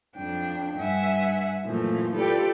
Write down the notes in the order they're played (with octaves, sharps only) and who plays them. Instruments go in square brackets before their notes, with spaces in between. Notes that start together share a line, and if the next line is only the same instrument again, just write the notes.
[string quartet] F2 D4 G5
G2 E5 F#5 G#5
F#2 A#2 E3 F3 A3
F4 G4 A4 B4 D5 G5